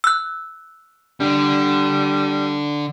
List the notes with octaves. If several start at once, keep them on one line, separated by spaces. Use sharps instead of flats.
E6 F#6
D3 G3